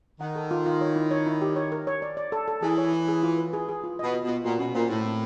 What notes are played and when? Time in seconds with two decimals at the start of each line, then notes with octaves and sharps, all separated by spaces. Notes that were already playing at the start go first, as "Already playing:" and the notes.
0.20 D#3 F#5
0.36 A4
0.51 F4
0.66 F4
0.81 C#5
0.96 E4
1.11 C#5
1.27 E4
1.42 G4
1.56 C#5
1.72 A#4
1.87 C#5
2.02 D5
2.17 D5
2.32 A4
2.48 A4
2.62 E3 G#4
2.78 C#5
2.93 E4
3.08 G#4
3.23 F4
3.38 B4
3.53 G#4
3.69 G#4
3.84 F4
3.99 B2 D#5
4.14 F4
4.24 B2 F4
4.44 A#2 F#4
4.59 B2 C#4
4.74 A#2 C5
4.90 A2 A4
5.05 C4